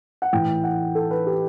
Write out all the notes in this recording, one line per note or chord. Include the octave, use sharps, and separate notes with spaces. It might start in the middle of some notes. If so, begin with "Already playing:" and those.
F#5
A2 E3 G5
F#5
A4
B4
G4